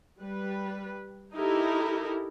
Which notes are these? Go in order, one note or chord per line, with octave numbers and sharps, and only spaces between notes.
G3 B4
D#4 E4 G4 A4 A#4